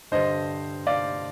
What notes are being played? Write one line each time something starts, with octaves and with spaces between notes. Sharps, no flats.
G2 D3 G3 C5 D#5
D5 F5